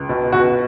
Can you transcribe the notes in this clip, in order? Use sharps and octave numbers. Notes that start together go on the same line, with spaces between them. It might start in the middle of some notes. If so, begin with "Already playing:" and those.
Already playing: C#2
B2
B2 F#4